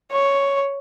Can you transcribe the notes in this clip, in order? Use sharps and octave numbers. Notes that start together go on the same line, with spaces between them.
C#5